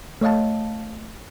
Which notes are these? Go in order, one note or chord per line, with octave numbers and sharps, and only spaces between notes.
A3 C#5 D#5 F5 A5